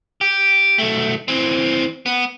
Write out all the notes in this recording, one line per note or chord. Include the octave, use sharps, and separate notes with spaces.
G4
B1 A3
E3 C4
B3